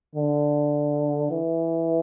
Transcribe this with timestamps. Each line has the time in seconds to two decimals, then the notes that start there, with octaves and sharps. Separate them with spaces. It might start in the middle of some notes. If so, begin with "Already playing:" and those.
0.15 D3
1.31 E3